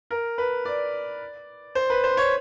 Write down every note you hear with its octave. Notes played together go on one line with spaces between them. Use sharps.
A#4
B4
D5
C5
B4
C5
C#5